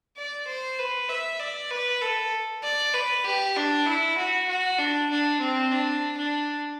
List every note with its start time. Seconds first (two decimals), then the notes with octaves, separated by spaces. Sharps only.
0.17 D5
0.47 C5
0.79 B4
1.09 E5
1.40 D5
1.71 B4
2.02 A4
2.63 D5
2.94 B4
3.25 G4
3.56 D4
3.86 E4
4.17 F#4
4.48 F#4
4.78 D4
5.10 D4
5.41 C4
5.71 D4
6.17 D4